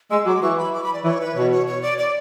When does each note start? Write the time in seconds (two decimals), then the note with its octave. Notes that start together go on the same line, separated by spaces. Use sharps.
0.11 G#3 E6
0.26 F#3 D6
0.42 E3 C#6
0.58 B5
0.74 D6
0.84 B5
0.94 D5
1.04 E3 C#5
1.21 B4
1.35 B2 C#5
1.52 C#5
1.67 C#5
1.82 D5
1.98 D5